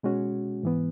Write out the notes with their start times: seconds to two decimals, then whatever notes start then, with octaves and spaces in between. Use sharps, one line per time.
0.03 B2 G#3 C#4 F#4
0.63 G#2 E3 B3